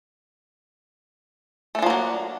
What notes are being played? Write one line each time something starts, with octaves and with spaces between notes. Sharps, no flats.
F3 F#3 A3 A#3 D4